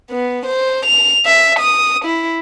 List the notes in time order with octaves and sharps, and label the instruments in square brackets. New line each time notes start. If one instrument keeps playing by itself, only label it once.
[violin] B3
C5
F7
E5
D#6
E4